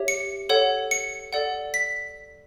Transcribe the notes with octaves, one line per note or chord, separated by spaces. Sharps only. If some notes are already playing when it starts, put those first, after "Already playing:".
Already playing: G4 C#5 E5
C#7
A4 C#5 F#5
C#7
A4 D5 F#5
B6